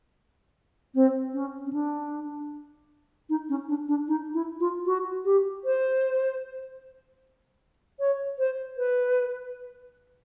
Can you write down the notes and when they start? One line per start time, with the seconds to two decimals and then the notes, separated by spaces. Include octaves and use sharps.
0.95 C4
1.34 C#4
1.66 C#4
1.73 D4
3.30 D#4
3.49 C#4
3.68 D4
3.88 D4
4.08 D#4
4.34 E4
4.60 F4
4.86 F#4
5.25 G4
5.65 C5
8.00 C#5
8.39 C5
8.78 B4